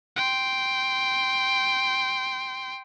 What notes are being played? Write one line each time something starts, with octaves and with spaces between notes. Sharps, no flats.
G5 C6